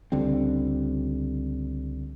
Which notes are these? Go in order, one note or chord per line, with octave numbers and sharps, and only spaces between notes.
C#2 D3 G3 C4